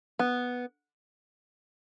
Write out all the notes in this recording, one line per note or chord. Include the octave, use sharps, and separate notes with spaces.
B3